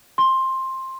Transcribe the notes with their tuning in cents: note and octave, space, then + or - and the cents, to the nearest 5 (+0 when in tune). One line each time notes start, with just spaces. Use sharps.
C6 +15